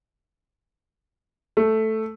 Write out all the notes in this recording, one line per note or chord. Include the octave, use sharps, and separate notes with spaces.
A3